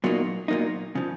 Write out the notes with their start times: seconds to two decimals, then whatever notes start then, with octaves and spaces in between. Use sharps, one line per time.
0.04 A#2 F#3 A#3 D#4
0.48 A#2 F#3 A#3 D#4
0.95 C#3 F3